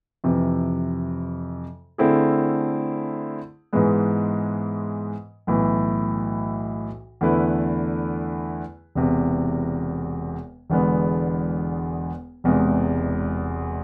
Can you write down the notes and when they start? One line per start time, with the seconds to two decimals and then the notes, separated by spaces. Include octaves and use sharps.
0.24 F2 C3 E3
1.98 D3 A3 C4 E4 G#4
3.73 G#2 E3 G#3 B3
5.47 B1 A2 E3
7.21 E2 D3 A3 E4 B4
8.95 E1 E2 C3
10.70 E1 E2 D3 G#3 B3
12.44 E1 E2 C3 G#3